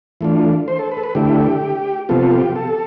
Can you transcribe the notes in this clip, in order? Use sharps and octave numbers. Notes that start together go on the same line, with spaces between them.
E3 A3 D4 F4
C5
A4
B4
A4
B4
D3 A3 E4 G4
C3 F3 B3 F4 A4
G4
A4